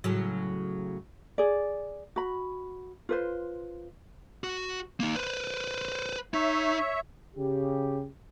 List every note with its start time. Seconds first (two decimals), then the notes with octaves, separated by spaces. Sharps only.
0.04 A2 C#3 F#3
1.38 G#4 D5
2.16 F#4 B5
3.09 F4 B4 C5
4.44 F#4
5.00 A#3 D#4
5.15 B4 C5
6.34 D#4 C#5 E5
7.37 C#3 G4